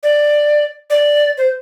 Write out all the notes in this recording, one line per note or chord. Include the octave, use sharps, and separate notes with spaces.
D5
D5
C5